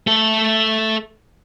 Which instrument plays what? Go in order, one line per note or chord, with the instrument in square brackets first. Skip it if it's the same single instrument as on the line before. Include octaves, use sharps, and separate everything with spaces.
[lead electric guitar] A3 A4